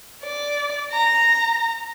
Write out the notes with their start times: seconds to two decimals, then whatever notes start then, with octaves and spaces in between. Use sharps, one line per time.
0.23 D5
0.91 A#5